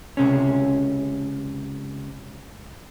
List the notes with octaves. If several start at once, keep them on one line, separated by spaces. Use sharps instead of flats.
C#2 C3 C#4